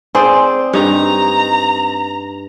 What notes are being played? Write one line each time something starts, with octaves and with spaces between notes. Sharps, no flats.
C4 G#4 C5 D5
G2 D#4 A#5